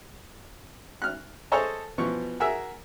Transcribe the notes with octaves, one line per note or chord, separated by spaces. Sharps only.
F6 F#6
G#4 A4 C5 C#5 D#5 A5
B2 E3 F3 C#6
F#4 G#4 A#4 E5 E6